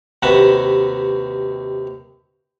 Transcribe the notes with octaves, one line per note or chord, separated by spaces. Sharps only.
D#2 C3 F#4 B4 A5